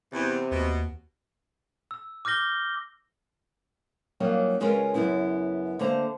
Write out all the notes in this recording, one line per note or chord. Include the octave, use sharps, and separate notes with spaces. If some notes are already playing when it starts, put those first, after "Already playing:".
E2 C3
D#2 B2
E6
D6 F6 G6 A#6 G7
F#3 G3 A#3 C#4 D#4 F4
C#3 G#3 C#4 F4 A#4 B4
F#2 A#2 C#3 B3 E4
D3 A3 A#3 C5 A#5